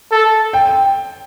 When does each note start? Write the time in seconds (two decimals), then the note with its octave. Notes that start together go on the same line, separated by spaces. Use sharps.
0.12 A4
0.53 G5